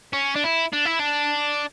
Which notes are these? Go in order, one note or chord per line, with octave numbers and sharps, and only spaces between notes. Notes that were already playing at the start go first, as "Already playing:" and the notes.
C#4
D4
E4
D4
E4
D4